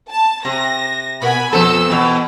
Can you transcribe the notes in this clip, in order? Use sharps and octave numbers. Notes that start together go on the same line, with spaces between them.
A5
C3 A#6
B2 B3 A#4 G#5 B5
F2 B3 A4 C5 E6
E2 B2